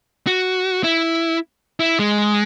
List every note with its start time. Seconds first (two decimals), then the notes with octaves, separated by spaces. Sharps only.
0.27 F#4
0.84 E4
1.80 E4
1.99 G#3